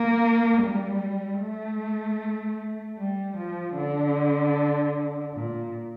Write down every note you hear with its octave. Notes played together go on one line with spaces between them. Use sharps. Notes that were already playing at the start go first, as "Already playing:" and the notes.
Already playing: A#3
G3
A3
G3
F3
D3
A#2